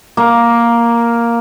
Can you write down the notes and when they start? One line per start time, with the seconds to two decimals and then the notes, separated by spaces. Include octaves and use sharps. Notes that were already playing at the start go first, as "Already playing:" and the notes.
0.17 A#3